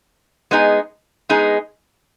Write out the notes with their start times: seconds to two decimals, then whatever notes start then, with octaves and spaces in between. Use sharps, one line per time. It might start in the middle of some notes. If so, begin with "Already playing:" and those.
0.51 G#3 B3 D#4 G#4
1.29 G#3 B3 D#4 G#4